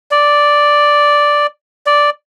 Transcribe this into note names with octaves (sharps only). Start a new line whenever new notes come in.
D5
D5